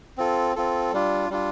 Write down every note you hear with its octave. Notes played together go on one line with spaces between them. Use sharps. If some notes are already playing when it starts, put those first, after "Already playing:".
C4 F4 A4
C4 F4 A4
G3 D4 F4
G3 D4 F4